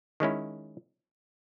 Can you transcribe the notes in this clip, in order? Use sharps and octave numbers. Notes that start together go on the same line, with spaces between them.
D#3 G#3 C#4 E4